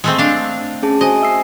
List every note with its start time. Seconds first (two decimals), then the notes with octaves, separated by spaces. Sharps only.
0.04 G#3 A3 C4
0.18 D4 F5
0.83 C#4 G#4 A5
1.01 F#4 C5 D#5 G#5
1.21 E5 E6 C7